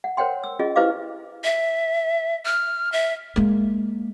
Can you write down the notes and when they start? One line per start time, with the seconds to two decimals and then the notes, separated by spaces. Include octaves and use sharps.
0.04 F#5
0.17 A#4 C5 C#5 F#5 G5 C6
0.44 E6
0.59 C#4 F4 G#4 D#5
0.76 E4 G4 B4 C5 F5 D6
1.44 E5
2.46 F6
2.92 E5
3.36 G#3 A#3